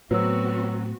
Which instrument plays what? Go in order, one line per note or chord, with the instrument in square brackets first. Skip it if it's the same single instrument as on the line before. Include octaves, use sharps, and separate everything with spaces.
[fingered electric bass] A2 [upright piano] F#3 [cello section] B3 C4 F#4 [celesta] B4 C#5 E6